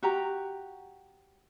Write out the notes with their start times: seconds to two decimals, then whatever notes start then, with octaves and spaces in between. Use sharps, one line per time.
0.03 F#4 G4 A#5